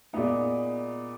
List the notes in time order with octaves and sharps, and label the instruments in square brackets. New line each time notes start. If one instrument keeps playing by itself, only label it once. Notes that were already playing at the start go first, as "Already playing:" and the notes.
[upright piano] A#2 G#3 B3 D#4